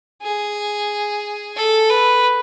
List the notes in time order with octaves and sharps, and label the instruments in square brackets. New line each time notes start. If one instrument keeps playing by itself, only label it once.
[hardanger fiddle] G#4
A4
B4